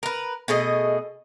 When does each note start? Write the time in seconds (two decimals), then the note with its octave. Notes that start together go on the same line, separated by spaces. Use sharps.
0.03 A#4 B4
0.48 B2 A3 G#4 D#5